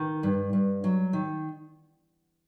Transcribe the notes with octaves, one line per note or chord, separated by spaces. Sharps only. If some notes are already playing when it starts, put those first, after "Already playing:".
Already playing: D#3
G2
G2
F#3
D#3